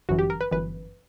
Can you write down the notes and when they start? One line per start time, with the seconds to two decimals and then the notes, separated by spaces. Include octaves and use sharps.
0.09 G1 F#2 E3 F#4
0.19 G4
0.30 A#4
0.41 B4
0.51 G1 F#2 E3 B4